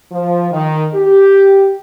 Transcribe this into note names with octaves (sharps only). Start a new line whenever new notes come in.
F3
D#3
G4